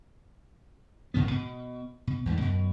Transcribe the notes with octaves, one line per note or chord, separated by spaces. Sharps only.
A1 G#2 D#3 B3
B2
B2
E2 G#2 A3
F#2 B2